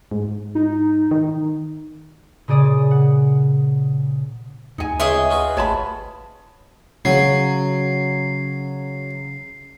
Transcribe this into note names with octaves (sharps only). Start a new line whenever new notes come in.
G#2
D#4
D#3
A#2 C#3 G#4 D5 D#6
F#5
D2 D#4 G#5
C#2 G#4 D#5 E5 G5 C#6 D#6
F4 F#4 B4
G#1 C#5 A5 B5
C#3 F#3 C7